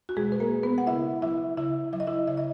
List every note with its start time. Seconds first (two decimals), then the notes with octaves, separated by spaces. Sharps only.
0.09 F#4
0.17 B2 G#3 G#4
0.32 B4
0.40 A#3 A#4
0.52 G#3
0.63 B3 B4
0.78 F#5
0.87 C#3 E4 E5
1.22 F#3 E4 E5
1.57 C#3 E4 E5
1.93 F#3 E5
2.00 D#5
2.07 E4 E5
2.27 C#3 E5
2.37 D#5